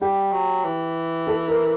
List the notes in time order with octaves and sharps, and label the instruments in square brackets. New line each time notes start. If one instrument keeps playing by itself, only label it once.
[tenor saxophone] G3 [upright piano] G4
[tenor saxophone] F#3
E3
[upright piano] A4
A#4